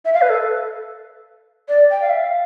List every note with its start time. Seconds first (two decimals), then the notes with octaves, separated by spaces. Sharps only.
0.05 E5
0.13 F5
0.22 B4
0.30 A4
1.69 D5
1.91 G5
2.02 F5
2.10 E5
2.19 F5